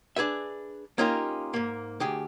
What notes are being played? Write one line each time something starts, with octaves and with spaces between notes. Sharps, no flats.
D4 G#4 B4 E5
A#3 C#4 D#4 F4 G4 A#4
G#2 A#3
D2 G4 G#4